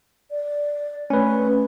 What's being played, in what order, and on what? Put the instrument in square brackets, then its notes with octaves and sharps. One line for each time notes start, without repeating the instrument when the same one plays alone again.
[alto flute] D5
[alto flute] A3 [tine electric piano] C#4 B4